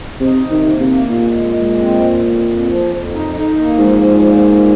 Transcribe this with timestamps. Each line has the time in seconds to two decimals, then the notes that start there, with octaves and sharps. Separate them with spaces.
0.20 C3 D#4
0.43 C3
0.51 D#3
0.66 A#3
0.80 C3
0.88 A#3
1.10 A#2 G#3
1.32 G#3
1.55 G#3
1.78 C4
2.00 F2
2.23 F2
2.45 F2
2.67 F3
2.90 F2
3.12 D#4
3.35 D#4
3.57 A#3
3.79 G#2 F3
4.02 A#2
4.24 A#3
4.47 A#2